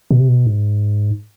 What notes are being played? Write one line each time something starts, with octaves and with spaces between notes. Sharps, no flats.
B2
C3
B2
G#2